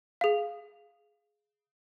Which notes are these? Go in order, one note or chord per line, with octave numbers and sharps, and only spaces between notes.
G#4 F5